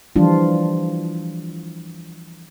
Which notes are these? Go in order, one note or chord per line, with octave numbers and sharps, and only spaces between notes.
E3 F3 G3 D4 F4